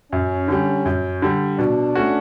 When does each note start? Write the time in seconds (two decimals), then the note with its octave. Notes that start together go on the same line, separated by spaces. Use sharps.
0.12 F#2 C#4
0.48 D3 G3
0.85 F#2
1.22 D3 G3
1.59 B2 D4
1.95 A3 C#4 F#4